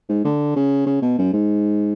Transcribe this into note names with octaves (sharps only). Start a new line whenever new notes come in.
G#2
D3
C#3
C#3
B2
F#2
G#2